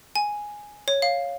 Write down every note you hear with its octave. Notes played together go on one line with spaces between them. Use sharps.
G#5
C#5
F5